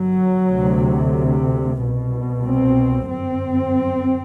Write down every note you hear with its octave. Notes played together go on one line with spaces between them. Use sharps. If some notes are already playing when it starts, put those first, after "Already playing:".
Already playing: G1 F#2 F#3
D2 C3
C2 B2
C4
G1 F#2 C4